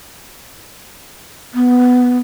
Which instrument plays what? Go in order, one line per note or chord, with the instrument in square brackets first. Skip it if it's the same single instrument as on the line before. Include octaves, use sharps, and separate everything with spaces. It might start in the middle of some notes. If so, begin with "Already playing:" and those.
[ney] B3